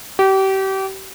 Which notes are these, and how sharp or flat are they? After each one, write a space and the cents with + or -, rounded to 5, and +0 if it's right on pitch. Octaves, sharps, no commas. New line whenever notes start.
G4 -30